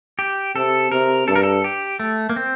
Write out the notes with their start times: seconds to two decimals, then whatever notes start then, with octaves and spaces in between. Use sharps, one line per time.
0.19 G4
0.56 C3 A4
0.91 C3 A#4
1.28 G2 A4
1.36 A#4
1.43 A4
1.64 G4
2.00 A3
2.29 A#3
2.36 C4